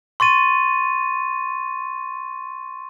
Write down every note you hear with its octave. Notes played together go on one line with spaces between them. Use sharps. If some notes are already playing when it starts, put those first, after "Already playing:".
C6 C#6 A6 D#7